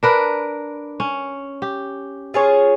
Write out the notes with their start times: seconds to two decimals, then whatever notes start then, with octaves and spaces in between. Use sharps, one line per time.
0.03 D4 A#4 B4
1.00 C#4
1.62 G4
2.34 F4 G#4 C#5